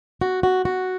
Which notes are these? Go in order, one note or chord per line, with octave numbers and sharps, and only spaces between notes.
F#4
F#4
F#4